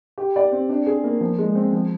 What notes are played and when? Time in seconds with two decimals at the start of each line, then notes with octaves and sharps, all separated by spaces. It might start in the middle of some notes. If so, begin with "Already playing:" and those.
0.18 G4
0.36 D5
0.52 C4
0.69 D4
0.86 G#4
1.04 A#3
1.21 F3
1.38 G#3
1.55 C4
1.73 F3